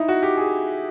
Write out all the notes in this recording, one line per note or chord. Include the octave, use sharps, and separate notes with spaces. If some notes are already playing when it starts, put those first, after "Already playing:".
Already playing: D#4 E4
F#4
G4
G#4